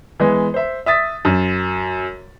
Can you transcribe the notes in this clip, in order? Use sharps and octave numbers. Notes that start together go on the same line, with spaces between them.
E3 G#3 B3
C5 E5
E5 D#6 A6 B6
F#2